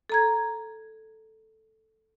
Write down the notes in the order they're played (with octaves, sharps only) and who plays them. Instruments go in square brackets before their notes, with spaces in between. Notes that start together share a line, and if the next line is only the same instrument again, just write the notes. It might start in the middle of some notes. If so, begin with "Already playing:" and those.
[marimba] A4 A#5 G#6